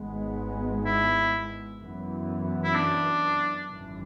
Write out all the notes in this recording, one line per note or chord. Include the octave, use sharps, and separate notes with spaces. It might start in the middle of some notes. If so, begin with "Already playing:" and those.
Already playing: G#1 G#2 G#3 B3
E4
F#2 E3 B3
E4
D4
G#1 F#2 E3